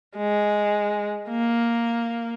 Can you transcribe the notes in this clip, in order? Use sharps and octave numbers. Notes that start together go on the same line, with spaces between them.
G#3
A#3